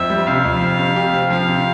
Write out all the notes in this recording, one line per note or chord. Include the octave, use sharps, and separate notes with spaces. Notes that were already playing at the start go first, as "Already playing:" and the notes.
Already playing: F2 C4 E5
G3
C3 F5
F2
C4
C3
G4
C4
F3 F5
C3